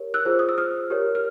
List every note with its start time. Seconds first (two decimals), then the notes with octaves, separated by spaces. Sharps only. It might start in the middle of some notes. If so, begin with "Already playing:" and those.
Already playing: G4 A#4 C#5
0.14 E6 F#6
0.25 F4 G#4 C5
0.39 D#6
0.49 E6
0.58 D#6 F6
0.90 G4 A#4 C#5
1.15 F6